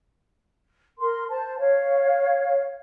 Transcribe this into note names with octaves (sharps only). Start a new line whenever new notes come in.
A#4 C6
C5 A5
C#5 F5